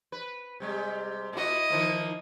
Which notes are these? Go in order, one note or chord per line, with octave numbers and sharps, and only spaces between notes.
B4
C3 G3 G#3
A#2 E4 F#4 D#5
D#3 F3 A#3